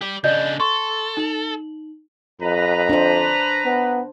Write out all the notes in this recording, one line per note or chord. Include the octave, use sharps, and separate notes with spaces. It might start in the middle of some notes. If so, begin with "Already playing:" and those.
G4 D5
C#3 D4 D5 D#5 G6
A4 C6 C#6
D#4 F#7
F2 B4 A#5
D4 C5
B3